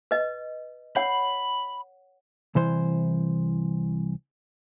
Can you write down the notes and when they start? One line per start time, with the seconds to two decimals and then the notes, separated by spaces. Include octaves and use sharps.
0.11 B4 D#5
0.96 C#5 F#5 B5
2.55 C2 E3 C5